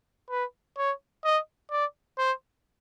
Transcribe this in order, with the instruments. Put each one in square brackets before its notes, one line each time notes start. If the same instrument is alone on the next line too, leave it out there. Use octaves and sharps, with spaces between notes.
[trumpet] B4
C#5
D#5
D5
C5